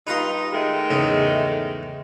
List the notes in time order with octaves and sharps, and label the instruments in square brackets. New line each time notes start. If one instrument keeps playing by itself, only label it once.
[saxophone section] G2 D#4 F4 [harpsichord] B4 A#5 C6
[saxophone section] D#3 G#3 A3
[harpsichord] E2 G#2 C#3